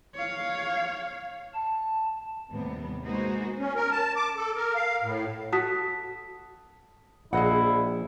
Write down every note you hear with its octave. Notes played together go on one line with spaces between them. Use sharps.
C#5 F5
A5
D#2 A2 C3 G3 B3
G#3 A#3 B3 D#4 F#4 C5
C#4
A#4
A5
D6
A4
A#4
F5
A2
F#4 A4 A5 D#6 B6
A#1 E4 G#4 D#5 F#5